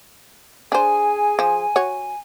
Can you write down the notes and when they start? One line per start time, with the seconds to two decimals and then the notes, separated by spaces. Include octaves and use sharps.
0.72 D4 G#4 C5 G#5
1.39 F3
1.76 F#4 C#5